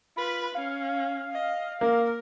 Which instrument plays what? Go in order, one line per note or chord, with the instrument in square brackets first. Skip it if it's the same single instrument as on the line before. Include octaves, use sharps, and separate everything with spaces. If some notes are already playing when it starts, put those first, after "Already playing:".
[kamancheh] F4 B4 [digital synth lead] B5
[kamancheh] C#4 [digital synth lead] F5
[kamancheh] D#5
[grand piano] A#3 [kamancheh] A#4